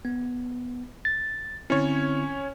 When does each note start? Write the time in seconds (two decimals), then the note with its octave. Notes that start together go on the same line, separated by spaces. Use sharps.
0.05 B3
1.05 A6
1.70 D3 C4 C#4 E4 C#5